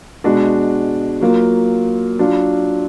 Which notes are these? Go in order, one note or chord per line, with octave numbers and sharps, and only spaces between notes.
B2 G#3 D4 F#4
F#3 A#3 F4
F#3 D4 F4